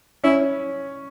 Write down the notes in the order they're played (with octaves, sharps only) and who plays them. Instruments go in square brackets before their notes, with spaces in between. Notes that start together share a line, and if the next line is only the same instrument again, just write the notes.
[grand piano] C#4 [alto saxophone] E4